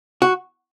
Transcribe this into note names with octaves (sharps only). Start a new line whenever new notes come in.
F#4